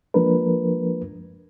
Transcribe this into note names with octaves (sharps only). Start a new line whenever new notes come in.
F3 G#3 A#3 D4 A#4 B4